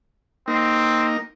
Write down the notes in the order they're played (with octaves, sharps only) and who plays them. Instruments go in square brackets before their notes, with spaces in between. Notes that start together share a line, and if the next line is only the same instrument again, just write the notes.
[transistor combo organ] A#3 D#4 [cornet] C4